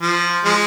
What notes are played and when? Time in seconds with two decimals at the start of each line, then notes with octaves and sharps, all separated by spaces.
0.01 F3
0.45 F3 G#3